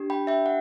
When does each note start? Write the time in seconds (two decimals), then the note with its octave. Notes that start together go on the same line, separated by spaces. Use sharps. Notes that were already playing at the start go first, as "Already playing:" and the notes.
Already playing: D4 G4
0.10 G5 B5
0.27 E5 G5
0.46 F#5